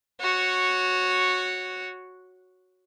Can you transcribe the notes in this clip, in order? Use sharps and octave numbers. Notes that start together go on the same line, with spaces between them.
F#4 C#5